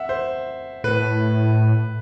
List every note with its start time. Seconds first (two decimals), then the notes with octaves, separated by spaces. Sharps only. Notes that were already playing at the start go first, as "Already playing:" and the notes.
Already playing: E5 F#5
0.09 C5
0.84 A2 B4